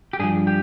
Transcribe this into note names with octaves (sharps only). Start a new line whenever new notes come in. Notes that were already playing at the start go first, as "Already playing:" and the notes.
G4
G2 F3 G#4
G4